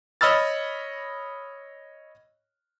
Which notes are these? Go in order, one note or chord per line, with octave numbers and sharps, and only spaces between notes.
C#5 D#5 B5 E6 F6 A6